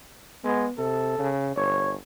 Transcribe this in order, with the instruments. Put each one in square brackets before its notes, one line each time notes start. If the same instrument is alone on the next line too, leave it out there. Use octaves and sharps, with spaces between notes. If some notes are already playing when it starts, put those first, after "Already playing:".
[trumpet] G#3 [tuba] B3
[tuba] C3 [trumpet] A4
[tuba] C#3
[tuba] G1 [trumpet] C#5